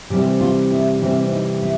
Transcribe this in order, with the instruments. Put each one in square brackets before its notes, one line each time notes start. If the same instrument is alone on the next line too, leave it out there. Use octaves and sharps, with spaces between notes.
[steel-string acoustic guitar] C3 E3 G3 C4 G4
F4
E4
C3 E3 G3 C4 D4
D4
D#4
E4